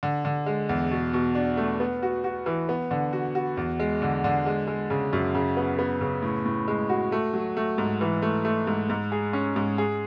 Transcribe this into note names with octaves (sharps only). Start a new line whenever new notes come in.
D3
D3
G#3
E2
B2
B2
D4
A3
B3
F#4
F#4
E3
B3
D3
F#4
F#4
E2
G#3
D3
D3
G#3
G#3
C#3
F#2
C#3
B3
B3
C#3
A2
A2
G#3
F#4
A3
F#3
A3
G#2
E3
A3
A3
G#2
G#2
G#4
C#4
G#2
G#4